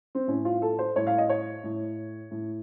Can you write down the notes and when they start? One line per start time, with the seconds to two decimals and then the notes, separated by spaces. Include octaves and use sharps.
0.15 C4
0.27 A2 C#4
0.45 F4
0.62 A4
0.79 C5
0.96 A2 C#5
1.07 F5
1.18 D#5
1.29 C#5
1.64 A2
2.31 A2